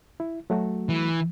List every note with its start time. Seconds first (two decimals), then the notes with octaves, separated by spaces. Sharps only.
0.20 E4
0.50 F#3 A3 F#4
0.89 E3